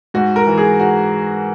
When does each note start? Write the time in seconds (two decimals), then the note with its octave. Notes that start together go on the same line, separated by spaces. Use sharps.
0.14 G#2 F#4
0.36 A#4
0.47 E3
0.58 G#4
0.80 F#4